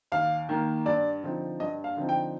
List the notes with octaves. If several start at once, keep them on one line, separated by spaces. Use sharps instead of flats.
D#2 F5
D#3 A#3
G2 D5
D3 F3 C4 D#4
G2 D#5
F5
D3 F3 C4 D#4
G5